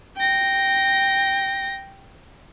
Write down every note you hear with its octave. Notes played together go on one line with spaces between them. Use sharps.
G5 A#6